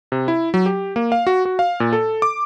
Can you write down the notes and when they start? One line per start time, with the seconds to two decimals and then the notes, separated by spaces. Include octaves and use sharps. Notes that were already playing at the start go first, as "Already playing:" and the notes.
0.12 C3
0.28 E4
0.54 F#3
0.66 G4
0.96 A#3
1.12 F5
1.27 F#4
1.45 F#4
1.59 F5
1.80 A#2
1.93 A4
2.22 D6